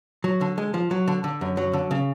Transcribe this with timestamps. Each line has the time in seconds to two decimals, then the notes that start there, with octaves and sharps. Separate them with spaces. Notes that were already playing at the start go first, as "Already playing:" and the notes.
0.24 F#3
0.41 D3
0.58 G#3
0.74 F3
0.91 F#3
1.08 D3
1.24 D3
1.41 F#2
1.57 F#3
1.73 D3
1.91 C#3